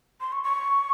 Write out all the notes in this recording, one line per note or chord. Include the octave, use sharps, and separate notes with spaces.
C6
C#6
C#6